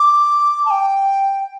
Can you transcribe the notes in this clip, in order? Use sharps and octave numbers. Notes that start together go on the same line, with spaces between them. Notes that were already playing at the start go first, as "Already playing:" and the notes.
Already playing: D6
A5
G5